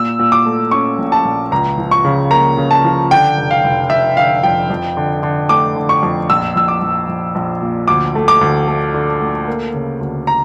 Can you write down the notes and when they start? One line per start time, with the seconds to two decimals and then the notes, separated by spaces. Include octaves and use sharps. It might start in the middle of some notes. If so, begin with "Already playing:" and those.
Already playing: A#2 E6
0.19 A#2
0.32 D6
0.46 A3
0.71 C#4 C#6
0.98 A#1
1.12 A5
1.25 A#1
1.51 C#2 A#5
1.78 F3
1.91 C#6
2.04 C#3
2.31 A#3 A#5
2.57 C#3
2.71 A5
2.84 F3
3.11 D3 G5
3.37 F1
3.51 F5
3.64 F1
3.90 F1 E5
4.17 D3 F5
4.43 F2 G5
4.70 F2
4.97 D3
5.23 D3
5.49 A3 D6
5.76 D3
5.89 C#6
6.03 F2
6.30 A#1 E6
6.56 A#1 E6
6.68 D6
6.81 A#1
7.08 A#1
7.35 A#1
7.62 A#2
7.88 D2 D6
8.15 A3
8.28 D6
8.41 D2
8.68 A3
8.94 D3
9.21 A3
9.48 A#3
9.74 C#3
10.01 D2
10.27 A#5